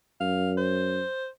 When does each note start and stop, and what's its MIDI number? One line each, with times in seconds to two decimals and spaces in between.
0.21 1.02 42
0.21 0.51 77
0.58 1.27 72